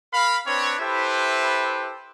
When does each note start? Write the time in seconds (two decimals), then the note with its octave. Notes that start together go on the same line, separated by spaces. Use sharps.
0.14 A#4 F5 B5
0.47 C4 D4 B4 C#5
0.80 E4 G4 A4 B4 C5 E5